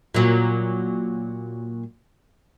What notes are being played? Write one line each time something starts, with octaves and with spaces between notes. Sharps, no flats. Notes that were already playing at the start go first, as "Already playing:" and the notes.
A#2 F#3